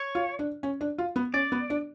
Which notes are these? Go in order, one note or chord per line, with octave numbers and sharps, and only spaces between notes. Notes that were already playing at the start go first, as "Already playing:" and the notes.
Already playing: C#5
F4
D4
C#4
D4
F4
B3
C#4 D5
B3
D4